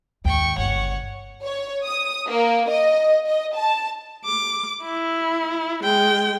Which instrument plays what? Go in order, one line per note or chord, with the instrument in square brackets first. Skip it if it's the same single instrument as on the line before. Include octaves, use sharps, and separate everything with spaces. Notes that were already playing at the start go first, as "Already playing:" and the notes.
[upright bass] D#2 G#2 [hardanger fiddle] G5 C#6
[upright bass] G1 C#3 [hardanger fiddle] C#5 F#5
[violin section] C#5
D#6
A#3
D#5
D#5
A5
[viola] D6
E4
G#3 G5